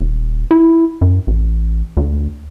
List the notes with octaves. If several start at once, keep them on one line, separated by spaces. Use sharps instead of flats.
D#1
E4
F#2
A1
D2